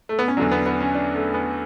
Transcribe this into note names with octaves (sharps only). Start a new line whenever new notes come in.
A3
B3
C#4
E2 D3 F#3 D4
B3
B3
C#4
D4
A3
B3